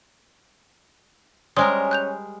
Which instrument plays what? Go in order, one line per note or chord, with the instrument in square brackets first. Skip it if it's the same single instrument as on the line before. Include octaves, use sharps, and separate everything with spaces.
[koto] G3 G#3 A#4 [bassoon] C#4 [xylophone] C5 C6 D#6
[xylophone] F#6 G6 F7